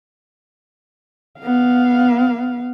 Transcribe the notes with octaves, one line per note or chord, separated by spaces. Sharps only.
B3 F5